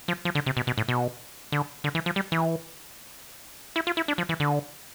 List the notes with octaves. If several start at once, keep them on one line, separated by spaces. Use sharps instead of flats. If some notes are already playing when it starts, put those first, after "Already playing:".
F3
F3
D3
C3
B2
B2
A2
B2
D3
D3
E3
F3
G3
E3
E4
F4
E4
D4
F3
E3
D3